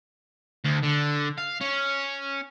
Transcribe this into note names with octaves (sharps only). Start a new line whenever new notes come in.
D2
D3
F5
C#4